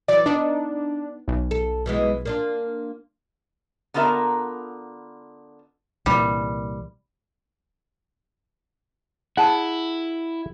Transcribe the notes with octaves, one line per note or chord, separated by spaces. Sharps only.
E3 F#3 D5
B3 D4 D#4
B1
A4
B2 E3 G#3
A#3 D4 F4
D3 B3 F4 A#4 E5 A#5
C2 A#2 E3 G3
E4 G#4 F#5 A5